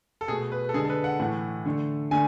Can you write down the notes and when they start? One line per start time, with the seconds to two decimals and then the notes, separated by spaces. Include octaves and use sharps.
0.21 A4
0.28 B2 A3 G#4
0.52 B4
0.69 A4
0.74 D3 G#3 G#4
0.85 A4
0.90 B4
1.04 F#5
1.20 A2 E3 A3 F#5
1.66 D3 A3
2.11 D3 A3 G#5